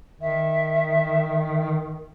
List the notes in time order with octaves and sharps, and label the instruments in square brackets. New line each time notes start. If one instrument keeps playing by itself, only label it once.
[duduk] D#3 [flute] E5